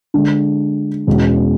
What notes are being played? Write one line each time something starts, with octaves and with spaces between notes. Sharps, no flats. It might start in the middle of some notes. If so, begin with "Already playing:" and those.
D3 G#3 D4
E2 B2 G#3 C#4